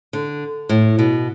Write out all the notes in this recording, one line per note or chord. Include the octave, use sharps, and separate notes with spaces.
D3
A2
B2